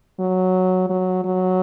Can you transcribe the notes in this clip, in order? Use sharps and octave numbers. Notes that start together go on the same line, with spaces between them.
F#3
F#3
F#3